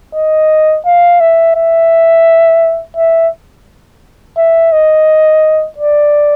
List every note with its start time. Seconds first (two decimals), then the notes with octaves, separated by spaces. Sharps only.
0.15 D#5
0.86 F5
1.21 E5
1.56 E5
2.97 E5
4.38 E5
4.72 D#5
5.78 D5